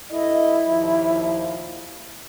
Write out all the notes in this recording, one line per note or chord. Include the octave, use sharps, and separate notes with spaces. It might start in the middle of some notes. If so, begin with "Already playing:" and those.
G2 E4 A4 D#5
D#2 A#2 F3